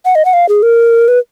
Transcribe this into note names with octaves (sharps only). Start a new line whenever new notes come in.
F#5
D#5
F#5
F5
G#4
A#4
B4